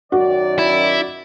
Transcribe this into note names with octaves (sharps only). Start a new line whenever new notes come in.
F#2 D#3 F#4 D5
E4